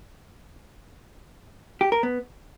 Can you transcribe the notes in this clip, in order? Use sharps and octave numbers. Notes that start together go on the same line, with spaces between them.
G4
A#4
B3